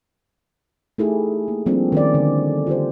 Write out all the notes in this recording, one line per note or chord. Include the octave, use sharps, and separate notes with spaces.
A3 D#4 E4 G4 G#4
A#3
F3 G3 A#3 C4 D4 F4
D#3 C#4 D5
D3
F4 G4 C5